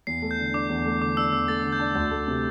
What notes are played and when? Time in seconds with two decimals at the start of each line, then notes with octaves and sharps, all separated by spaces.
0.07 E2 C7
0.22 A3
0.31 G6
0.39 D3
0.53 D4 D6
0.70 E2
0.85 A3
1.01 D3 D6
1.17 D4 E6
1.32 E2 E6
1.48 A3 A6
1.60 D3 E6
1.73 G6
1.79 D4
1.95 D2 G6
2.11 A3
2.28 C3